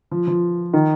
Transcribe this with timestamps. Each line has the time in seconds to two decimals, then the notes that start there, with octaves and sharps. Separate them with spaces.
0.12 F3
0.27 F3
0.74 D#3